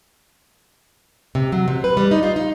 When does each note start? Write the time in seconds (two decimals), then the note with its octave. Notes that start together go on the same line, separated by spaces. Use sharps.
1.35 C3
1.52 F#3
1.68 C3
1.84 B4
1.97 G3
2.11 D#4
2.23 F4
2.36 D#4